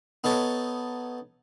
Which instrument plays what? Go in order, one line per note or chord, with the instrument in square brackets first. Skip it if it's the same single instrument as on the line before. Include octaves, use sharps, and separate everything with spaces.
[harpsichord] B3 D#4 A4 C#5